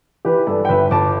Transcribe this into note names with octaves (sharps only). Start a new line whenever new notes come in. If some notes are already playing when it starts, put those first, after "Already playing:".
E3 G4 B4
G2 A4 D5
G5
G1 B4 E5
G1 A5 D6